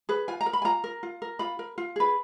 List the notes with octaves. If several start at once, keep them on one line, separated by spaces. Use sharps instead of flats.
G#4 B4
F4 G#5
A#5
A#4
B5
G#5
F4 A#5
A#4
F4
A#4
F4 B5
A#4
F4
G#4 B4